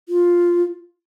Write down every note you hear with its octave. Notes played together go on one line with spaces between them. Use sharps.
F4